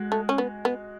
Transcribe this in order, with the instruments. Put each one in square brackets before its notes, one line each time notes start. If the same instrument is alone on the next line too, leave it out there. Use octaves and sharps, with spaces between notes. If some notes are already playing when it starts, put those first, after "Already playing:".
Already playing: [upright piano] G#3 F#4
[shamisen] A3
C#4
B3
B3